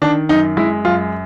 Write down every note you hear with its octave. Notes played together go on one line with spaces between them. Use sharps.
D#3 D4
F#2 D#4
G#3 E4
F#2 F4